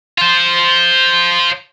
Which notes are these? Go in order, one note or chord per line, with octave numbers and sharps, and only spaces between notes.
F4 C5